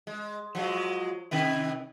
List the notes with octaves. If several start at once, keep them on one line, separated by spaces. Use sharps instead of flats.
G#3
F3 F#3 G#3
C3 D#3 E4